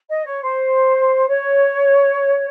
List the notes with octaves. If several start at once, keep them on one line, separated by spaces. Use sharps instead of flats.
D#5
C#5
C5
C#5